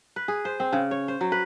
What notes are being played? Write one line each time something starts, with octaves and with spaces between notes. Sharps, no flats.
B4
G#4
C5
C4
C#3
C#5
C5
F#3
B4